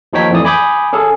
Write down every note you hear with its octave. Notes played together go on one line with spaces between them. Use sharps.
D#2 F3 D#4 C#5 G5 B6
F2 A2 E3 D5 D#6
G#5 B5 D6 D#6 G6
C#4 G#4 A4